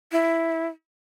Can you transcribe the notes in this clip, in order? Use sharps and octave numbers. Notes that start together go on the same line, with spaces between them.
E4